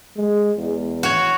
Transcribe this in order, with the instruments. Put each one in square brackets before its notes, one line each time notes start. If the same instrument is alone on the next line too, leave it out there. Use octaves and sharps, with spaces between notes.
[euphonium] G#3
E2
[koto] F#4 C#5